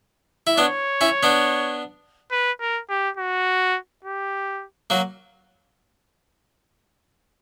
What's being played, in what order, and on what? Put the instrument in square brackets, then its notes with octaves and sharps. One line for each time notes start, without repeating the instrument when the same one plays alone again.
[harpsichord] E4
[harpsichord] B3 D4 [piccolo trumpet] C#5
[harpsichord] C#4 E4
B3 D4
[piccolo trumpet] B4
A#4
G4
F#4
G4
[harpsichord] F#3 A#3